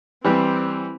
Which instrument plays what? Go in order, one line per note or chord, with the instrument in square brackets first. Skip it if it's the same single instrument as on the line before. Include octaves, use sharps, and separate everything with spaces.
[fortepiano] E3 G3 G4 [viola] C4